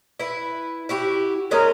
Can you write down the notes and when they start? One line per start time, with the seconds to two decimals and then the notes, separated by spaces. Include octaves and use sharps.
0.20 E4 B4
0.89 E4 F#4 G4
1.51 G#3 C#4 A#4 D#5